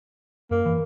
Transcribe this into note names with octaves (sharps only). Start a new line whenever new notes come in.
F#2 A#3
E3